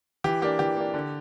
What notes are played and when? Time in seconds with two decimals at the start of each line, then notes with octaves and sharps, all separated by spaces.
0.24 E3 G4
0.42 A#3 D4 G4
0.59 E3 G4
0.77 A#3 D4
0.94 D3